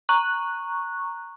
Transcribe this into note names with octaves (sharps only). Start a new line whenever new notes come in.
A#5 C#6 F#6